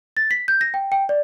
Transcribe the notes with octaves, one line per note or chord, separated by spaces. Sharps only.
A6
B6
G6
A#6
G5
G5
D5